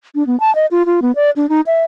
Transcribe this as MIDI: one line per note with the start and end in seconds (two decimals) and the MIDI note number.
0.15 0.26 62
0.27 0.38 59
0.40 0.54 81
0.55 0.66 75
0.71 0.86 65
0.86 1.00 65
1.02 1.12 59
1.16 1.30 74
1.36 1.49 62
1.49 1.61 63
1.67 1.84 76